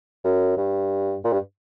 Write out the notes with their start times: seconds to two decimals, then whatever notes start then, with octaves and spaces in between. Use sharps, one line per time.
0.24 F#2
0.57 G2
1.24 A#2
1.33 G2